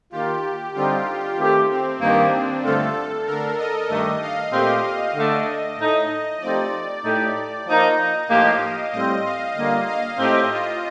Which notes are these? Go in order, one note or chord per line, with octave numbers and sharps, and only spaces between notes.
D#3 A#3 F4 G4
D3 G3 C4 D#4 F4 G4
D#3 A3 C4 G4
C4
G2 D#3 A#3 D4 D#4 G4
G2 D3 A3 C4 F4 A4
D3 A3 D4 A#4
D#5
G2 D#3 A3 D4 D#5
F5
A#2 A3 C4 G4 D#5
D3 A3 D4
A2 A3 D#4
F3 A3 C4 D#4 G4 D5
A2 A3 D#4 G4
F3 A#3 D#4 D#5
A2 F3 A#3 D#4 G4 F5
A2 G3 C4 D#5
F5
D3 G3 A#3 F4 D#5
F5
A2 A3 C4 D#4 G4 D#5
F4